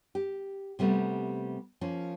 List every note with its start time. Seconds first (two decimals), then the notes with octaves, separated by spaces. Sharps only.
0.15 G4
0.79 C3 G3 A3 B3
1.81 F3 A#3 C#4